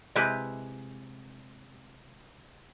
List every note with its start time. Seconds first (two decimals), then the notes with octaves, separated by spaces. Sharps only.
0.15 C3 G#3 E4 G4 B4